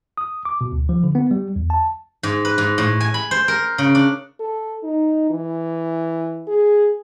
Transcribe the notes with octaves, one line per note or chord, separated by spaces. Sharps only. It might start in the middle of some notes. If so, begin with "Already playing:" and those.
D#6
D6
B2
D2
F3
D3
B3
G3
E2
A5
G#2
B4
G#2
A2
G#5
B5
C5
A#4
C#3
D4
A4
D#4
E3
G#4